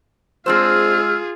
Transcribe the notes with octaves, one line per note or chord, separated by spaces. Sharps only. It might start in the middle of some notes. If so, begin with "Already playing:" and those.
G#3 C4 D4 F4 G#4 C5 E6 F6